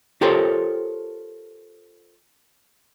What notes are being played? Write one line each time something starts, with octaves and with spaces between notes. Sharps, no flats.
F4 G4 A4 A#4 C5 C#5